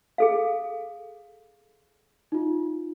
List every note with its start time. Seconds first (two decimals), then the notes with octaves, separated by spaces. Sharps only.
0.18 G#4 A4 F5
2.32 D#4 F4